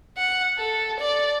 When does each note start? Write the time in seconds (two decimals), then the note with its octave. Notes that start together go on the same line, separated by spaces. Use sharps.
0.17 F#5
0.58 A4
1.00 D5